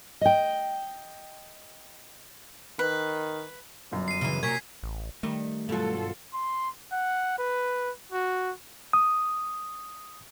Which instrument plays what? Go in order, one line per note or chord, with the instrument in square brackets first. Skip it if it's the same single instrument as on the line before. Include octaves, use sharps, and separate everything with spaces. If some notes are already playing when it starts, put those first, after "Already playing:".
[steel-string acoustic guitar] D#5 G5
[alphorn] D#3 [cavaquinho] B4
[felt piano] G1 F#2
[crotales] C7 D#7
[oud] C#3 E3
[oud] C3 F#3 A#3 [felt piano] G#5 [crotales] G#6 B6
[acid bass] A1
[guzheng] D#3 [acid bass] G3 [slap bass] A3
[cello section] G2 F4 A4 [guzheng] B2 F#3
[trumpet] C6
F#5
B4
F#4
[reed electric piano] D#6